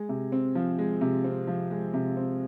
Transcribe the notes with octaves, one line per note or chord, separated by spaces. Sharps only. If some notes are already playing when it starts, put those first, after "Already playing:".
Already playing: G#3
C3
C4
F3
G#3
C3
C4
F3
G#3
C3
C4